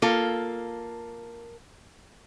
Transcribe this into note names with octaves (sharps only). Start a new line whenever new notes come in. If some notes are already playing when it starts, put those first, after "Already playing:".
A#3 F4 A4